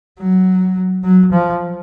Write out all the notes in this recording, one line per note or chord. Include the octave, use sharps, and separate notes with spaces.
F#3
F#3
F3